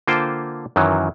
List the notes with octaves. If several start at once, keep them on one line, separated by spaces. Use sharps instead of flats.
D3 A#3 F4 C5 G5 A5
F#2 D#3 E3 F#3